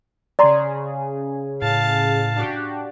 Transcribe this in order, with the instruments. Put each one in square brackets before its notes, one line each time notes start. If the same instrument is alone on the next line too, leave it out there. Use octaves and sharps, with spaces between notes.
[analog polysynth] C#3 G#4 [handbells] D5 A#5 C6
[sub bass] A2 [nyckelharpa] F5 A5
[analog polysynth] D4 F#4 G4